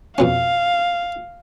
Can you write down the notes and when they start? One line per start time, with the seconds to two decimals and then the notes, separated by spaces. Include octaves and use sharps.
0.18 F2 B2 C#4 F5